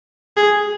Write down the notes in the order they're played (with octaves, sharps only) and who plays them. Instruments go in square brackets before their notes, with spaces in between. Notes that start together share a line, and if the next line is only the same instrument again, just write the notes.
[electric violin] G#4